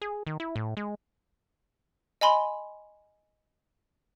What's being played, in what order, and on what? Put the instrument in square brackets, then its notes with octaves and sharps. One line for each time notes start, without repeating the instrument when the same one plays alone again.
[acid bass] G#4
D#3
E4
A2
G#3
[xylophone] D#5 G#5 B5 C6